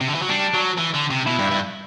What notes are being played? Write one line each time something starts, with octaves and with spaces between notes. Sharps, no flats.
C3
D3
E3
F#3
G3 D4
F#3
E3
D3
C3
B2 E4
G2
G2